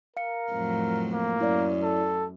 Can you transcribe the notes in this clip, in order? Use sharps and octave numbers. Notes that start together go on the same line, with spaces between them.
A#4 F5 C#7
F2 A2 F#3
A#3
F#2 E4 C#5 D5
A4